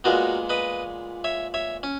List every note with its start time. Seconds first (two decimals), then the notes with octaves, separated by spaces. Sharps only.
0.04 A#2 G#3 B3 F#4 A#4
0.49 B4 D#5
1.24 C#5 E5
1.54 C#5 E5
1.83 C#4